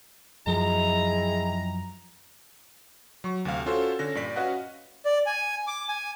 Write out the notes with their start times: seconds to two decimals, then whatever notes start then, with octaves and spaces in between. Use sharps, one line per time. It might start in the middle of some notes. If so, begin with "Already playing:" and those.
0.47 F#2 C3 F3 G#3 E4 A#5
3.24 F#3 C#6
3.45 D2 C3 F5
3.66 C#4 F4 F#4 A4 C5
3.99 D3 C#4 A#6
4.15 G2 A#2 D5 B6
4.36 C#4 F#4 B4 D#5 F5 F#5
5.05 D5
5.26 G#5
5.67 D6
5.89 G#5